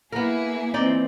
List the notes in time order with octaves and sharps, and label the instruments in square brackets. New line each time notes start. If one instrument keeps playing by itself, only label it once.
[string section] A#3 E4 G#4 [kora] B3 A#4
[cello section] E3 C4 [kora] D#4 D5